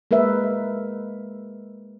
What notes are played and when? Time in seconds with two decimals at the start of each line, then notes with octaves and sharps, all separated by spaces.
0.11 G#3 A#3 A#4 B4 E5